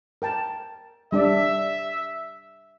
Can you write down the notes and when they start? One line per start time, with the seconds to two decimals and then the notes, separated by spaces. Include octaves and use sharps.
0.22 A#4 G5 A5
1.12 G3 D4 D5 E5